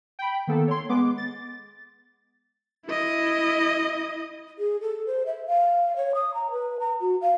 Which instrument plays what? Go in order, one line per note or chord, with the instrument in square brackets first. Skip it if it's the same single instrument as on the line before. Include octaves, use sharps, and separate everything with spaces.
[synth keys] G5 B5
D#3 A#3 B3 A4
C#5 C6
G#3 B3 D6
A6
[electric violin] E4 D#5
[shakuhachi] G#4
A4
C5
E5
F5
C#5
D#6
A#5
B4
A#5
F#4
F5